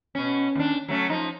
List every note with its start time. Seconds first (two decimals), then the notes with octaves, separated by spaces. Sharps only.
0.15 B2 C#4
0.55 D#2 D4
0.88 F#3 A3 C#4
1.09 F3 D#4